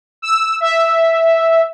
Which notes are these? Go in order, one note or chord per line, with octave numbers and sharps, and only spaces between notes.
E6
E5